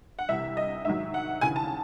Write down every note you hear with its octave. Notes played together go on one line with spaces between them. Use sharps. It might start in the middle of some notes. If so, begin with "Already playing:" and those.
F#5
C2 C3 E3 E5
D#5
G#2 D#3 F#3 E5
F#5
D#2 C#3 E3 G#5
A5